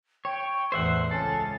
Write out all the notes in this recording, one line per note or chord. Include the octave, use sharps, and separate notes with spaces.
C#5 G5
A1 E2 C5 E5 F#5 C7
C#2 C#4 A4 A6